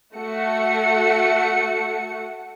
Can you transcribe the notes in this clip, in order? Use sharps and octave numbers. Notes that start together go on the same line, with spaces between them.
A3 F#4 F#5 C#7